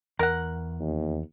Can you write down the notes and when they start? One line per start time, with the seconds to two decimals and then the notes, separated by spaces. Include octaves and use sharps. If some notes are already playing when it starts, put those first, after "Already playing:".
0.19 E2 A#4 F#5
0.80 D#2